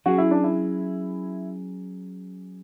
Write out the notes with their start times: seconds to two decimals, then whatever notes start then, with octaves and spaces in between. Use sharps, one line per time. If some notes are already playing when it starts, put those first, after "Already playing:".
0.06 F#3 C#4 F#4 G#4
0.18 E4
0.31 D4
0.44 E4